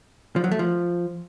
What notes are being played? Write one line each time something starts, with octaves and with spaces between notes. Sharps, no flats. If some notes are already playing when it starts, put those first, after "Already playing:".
F3
F#3
A3
F3